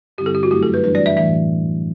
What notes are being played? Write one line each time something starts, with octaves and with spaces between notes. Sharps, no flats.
G2 D3 G3 C4 E4 G4
A4
G4
F#4
F#2 F#3 A3 E4 G4
A4
B4
E3 G3 D4 F#4 B4
D5
E5
A2 E3 A3 E5